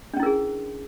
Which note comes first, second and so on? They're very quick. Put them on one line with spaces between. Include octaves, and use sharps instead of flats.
D4 C#4 E4 A#4 G#4